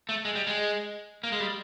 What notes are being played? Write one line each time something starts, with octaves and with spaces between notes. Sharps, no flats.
A3
G#3
G3
G#3
A#3
G#3
G3